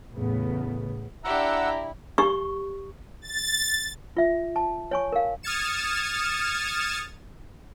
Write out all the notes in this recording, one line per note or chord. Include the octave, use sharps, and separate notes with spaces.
E2 A2 C#3 B3
D4 E4 G4 F#5 A#5 E6
G4 C#6
A6
F4 E5
A5
C#5 G#5 C#6
A#4 F5
D#6 F6 G#6 A6 C#7 E7